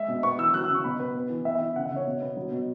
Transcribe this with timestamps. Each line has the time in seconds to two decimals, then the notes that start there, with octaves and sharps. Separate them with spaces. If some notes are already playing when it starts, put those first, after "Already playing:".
Already playing: G#3 E5
0.08 B2
0.23 B3 C#6
0.38 E3 E6
0.54 F#3 F#6
0.64 E6
0.69 C#3
0.74 C#6
0.84 B2 B5
0.99 B3 B4
1.15 B3
1.30 E3
1.45 B3 E5
1.55 E5
1.61 E3
1.76 C#3 F#5
1.86 E5
1.91 C#3
1.96 C#5
2.06 B2
2.21 B3
2.37 F#3
2.52 B2